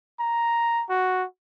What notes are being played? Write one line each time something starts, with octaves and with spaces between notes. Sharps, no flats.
A#5
F#4